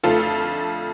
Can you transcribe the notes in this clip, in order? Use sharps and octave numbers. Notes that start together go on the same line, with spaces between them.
F2 D3 A3 F4 A4